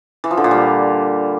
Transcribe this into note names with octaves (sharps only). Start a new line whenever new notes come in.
E3
F3
D3
A#2
G3